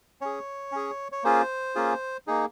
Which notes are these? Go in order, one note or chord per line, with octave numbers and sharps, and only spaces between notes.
C#4 G#4 C#5
C#4 G#4
C#5
A#3 C#4 F4 G#4 C5
A#3 C#4 F4 G#4
A#3 D#4 G#4